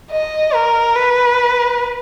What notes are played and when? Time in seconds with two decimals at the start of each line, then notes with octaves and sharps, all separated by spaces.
0.11 D#5
0.54 A#4
0.96 B4